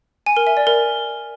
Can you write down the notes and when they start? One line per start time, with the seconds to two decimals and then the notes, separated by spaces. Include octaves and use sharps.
0.26 G#5
0.37 A#4
0.47 E5
0.57 D5
0.67 A#4